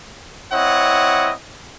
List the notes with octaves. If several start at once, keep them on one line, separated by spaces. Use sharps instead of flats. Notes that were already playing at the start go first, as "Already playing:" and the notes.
C4 E4 C#5 D#5 F#5